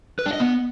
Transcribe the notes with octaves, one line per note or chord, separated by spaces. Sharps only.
B4
D4
D#5
B3